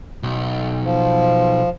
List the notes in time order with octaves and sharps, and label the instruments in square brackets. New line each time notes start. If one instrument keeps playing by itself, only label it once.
[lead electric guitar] B1
[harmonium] F3